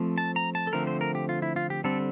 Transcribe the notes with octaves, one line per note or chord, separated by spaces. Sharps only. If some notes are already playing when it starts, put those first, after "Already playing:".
Already playing: F3 A3 C4
A5
A#5
A5
A4
D3 F3 A3 C4 A#4
C5
A#4
G4
F4
E4
F4
G4
D3 G3 C4 A4